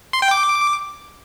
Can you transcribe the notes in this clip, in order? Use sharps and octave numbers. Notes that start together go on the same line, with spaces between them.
C6
G5
D6